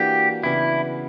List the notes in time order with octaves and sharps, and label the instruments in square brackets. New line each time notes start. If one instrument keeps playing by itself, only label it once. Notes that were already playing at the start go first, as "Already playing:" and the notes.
Already playing: [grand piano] E3 A#3 D4 F#4 [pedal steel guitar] G4
[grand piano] C#3 E3 B3 D4 F#4 [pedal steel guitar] E4